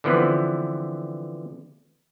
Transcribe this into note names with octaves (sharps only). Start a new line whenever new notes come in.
D3 E3 F3 B3 C4